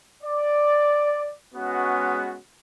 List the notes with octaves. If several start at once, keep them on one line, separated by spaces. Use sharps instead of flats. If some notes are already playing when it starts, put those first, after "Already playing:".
D5
G#3 B3 C#4 F#4